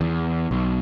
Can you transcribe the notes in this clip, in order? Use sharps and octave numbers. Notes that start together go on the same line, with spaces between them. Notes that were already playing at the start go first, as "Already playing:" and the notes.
E2
B1